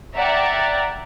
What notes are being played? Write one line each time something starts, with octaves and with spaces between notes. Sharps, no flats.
D5 E5 F#5 G5 A#5